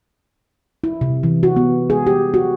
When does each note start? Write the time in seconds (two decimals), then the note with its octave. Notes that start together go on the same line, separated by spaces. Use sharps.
0.84 E4
1.01 C3
1.23 E3
1.43 F#4
1.56 B3
1.90 G#4
2.07 G4
2.34 F#4